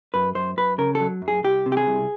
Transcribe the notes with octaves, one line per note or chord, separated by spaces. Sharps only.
F#2 B4
F#2 C5
F#2 B4
C#3 A#4
F#3 A4
F#2
G#4
C2 G4
C3
G4
G#4
C2